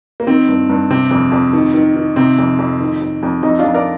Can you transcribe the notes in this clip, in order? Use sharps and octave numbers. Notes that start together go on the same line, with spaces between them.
A#3
D#3 C4
G2
G2
C3 C4
F2
F2
D#3
D#3
D#3
C3 C4
F2
F2
D#3
F2
F2
F2 C4 D#4
D4 F4
F2
A#4 D5